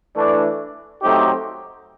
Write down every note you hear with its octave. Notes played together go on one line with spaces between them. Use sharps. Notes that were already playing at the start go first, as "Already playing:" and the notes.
E3 A3 D4
F#3 A3 C4 D#4 G4